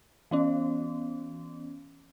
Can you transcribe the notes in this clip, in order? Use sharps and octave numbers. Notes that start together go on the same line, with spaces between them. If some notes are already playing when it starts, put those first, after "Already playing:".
E3 B3 C#4